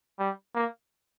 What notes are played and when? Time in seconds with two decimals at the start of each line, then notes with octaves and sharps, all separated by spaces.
0.19 G3
0.55 A#3